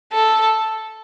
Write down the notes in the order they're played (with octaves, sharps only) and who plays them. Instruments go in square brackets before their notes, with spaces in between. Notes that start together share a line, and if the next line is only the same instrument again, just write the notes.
[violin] A4